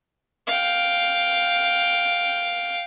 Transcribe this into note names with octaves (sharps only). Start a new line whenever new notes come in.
F5 G5